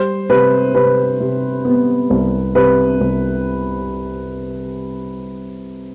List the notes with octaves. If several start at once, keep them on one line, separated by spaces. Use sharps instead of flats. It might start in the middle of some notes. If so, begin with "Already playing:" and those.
Already playing: G3 C5
C3 B4
C3 B4
C3
B3
C2
C3 B4
C2